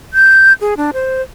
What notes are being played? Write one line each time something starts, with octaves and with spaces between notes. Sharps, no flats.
G6
G#4
D4
C5